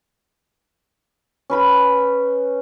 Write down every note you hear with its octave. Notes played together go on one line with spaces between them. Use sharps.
C#4 B4 B5